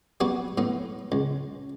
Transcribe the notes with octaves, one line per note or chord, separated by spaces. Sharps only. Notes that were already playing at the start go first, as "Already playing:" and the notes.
G3 B3 F#4
A2 B3
C#2